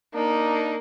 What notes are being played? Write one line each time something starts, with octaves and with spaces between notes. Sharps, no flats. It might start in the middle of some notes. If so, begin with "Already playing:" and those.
A#3 D4 D#4